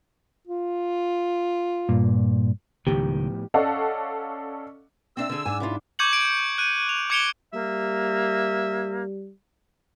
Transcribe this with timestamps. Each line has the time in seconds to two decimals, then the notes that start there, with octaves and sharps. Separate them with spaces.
0.47 F4
1.89 G2 A#2
2.87 C#2 A2 D#3 F3 B3 G4
3.54 C#4 A4 D5 D#5 F5 F#5
5.17 C4 D4 E5 E6
5.29 D3 G#4
5.45 G#2 D4 G#5
5.60 C#4 E4 F4
5.99 C#6 D6 G6 G#6 C#7 F#7
6.13 D7
6.58 F#6 D#7
6.89 F7
7.10 D6 G#6 C#7 D7 F7 G7
7.53 G3 A#3 E5